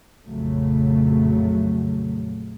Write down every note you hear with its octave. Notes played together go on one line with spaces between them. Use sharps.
A#1 F2 C#3 F#3 A3